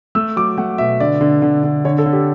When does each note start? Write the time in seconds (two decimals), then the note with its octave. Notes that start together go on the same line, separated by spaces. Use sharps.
0.15 A3 E6
0.36 F#3 D6
0.57 A3 F#5
0.78 B2 E5
1.00 D3 D5
1.21 D3
1.42 D3
1.64 D3
1.85 D3 C#5
1.98 A4
2.06 D3
2.13 G4